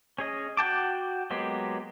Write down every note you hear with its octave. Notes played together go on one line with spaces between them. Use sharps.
C#4 G#4 D#5
F#4 F#5 G5 A5 D6
F#3 G#3 A#3 B3 G4